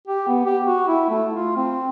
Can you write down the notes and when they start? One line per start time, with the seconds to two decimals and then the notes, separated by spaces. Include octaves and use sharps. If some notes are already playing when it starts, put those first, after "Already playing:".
0.08 G4
0.27 B3
0.46 G4
0.67 F#4
0.88 E4
1.09 A3
1.33 F4
1.56 C4